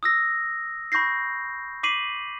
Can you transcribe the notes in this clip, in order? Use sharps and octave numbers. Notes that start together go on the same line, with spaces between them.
D#6 E6 A#6
B5 C#6 G6 A#6 C7
D6 B6 C7 D#7 F#7